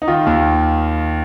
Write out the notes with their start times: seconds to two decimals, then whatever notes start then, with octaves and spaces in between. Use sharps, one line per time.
0.02 D#4
0.08 D#3 F4
0.26 D#2